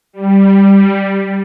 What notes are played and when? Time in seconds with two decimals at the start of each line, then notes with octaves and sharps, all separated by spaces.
0.13 G3